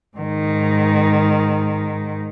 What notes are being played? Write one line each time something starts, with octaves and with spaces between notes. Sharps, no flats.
G#2 D#3